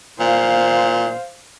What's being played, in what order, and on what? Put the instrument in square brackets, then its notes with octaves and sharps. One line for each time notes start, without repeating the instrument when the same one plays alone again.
[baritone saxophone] A#2 [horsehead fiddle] C5 F5